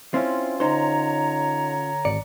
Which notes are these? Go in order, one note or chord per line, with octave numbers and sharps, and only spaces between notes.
C4 C#4 E4 F4
D3 D#4 C5 C#5 A#5
G#1 D5 C#7